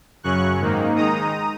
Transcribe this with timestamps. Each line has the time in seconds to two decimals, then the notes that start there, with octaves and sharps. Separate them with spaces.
0.23 F#2 C#3 F#3 C#4 C#6 F#6
0.60 G#2 D#3 A#3 D#4
0.96 D#3 G#3 D#4 A#5 D#6